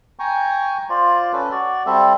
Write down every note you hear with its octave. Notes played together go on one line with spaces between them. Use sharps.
G5 G#5 A#5 C#6
F4 C5 D5
C#4 A4 B4
F#4 D5
G3 C4 A4 E5